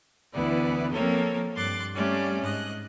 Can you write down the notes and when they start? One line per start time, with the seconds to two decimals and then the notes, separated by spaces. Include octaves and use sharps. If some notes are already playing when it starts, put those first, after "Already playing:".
0.34 D2 E3 B3 E4 B4 D5
0.91 F3 A#3 C4 A4 A#4 C#5
1.56 G2 C6 D6 F#6 A6
1.95 G3 A3 C4 C#4 G4 D5
2.41 G#2 D#5 F#6